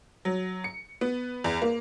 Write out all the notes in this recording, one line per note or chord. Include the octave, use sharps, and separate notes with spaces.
F#3
C#7
B3
E2
A#3